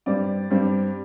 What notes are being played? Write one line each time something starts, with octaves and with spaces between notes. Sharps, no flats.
G2 G3 C4 D5
G2 G3 C4